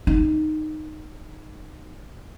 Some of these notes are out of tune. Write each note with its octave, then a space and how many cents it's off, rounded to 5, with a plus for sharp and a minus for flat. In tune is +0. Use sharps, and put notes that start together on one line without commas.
D#4 -10